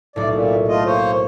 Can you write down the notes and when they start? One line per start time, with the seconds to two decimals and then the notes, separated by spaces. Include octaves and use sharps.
0.16 B1 A2 D5
0.30 A#2
0.68 A3 F4 D#5
0.85 A#3 C5 C#5